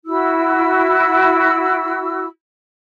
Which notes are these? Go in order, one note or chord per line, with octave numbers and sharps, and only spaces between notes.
E4 F#4 E6